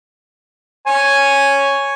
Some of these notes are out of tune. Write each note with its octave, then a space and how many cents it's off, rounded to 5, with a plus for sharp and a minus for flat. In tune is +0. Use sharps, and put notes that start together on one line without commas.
C#5 +0 G#5 +0